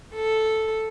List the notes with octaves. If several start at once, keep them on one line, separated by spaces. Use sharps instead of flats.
A4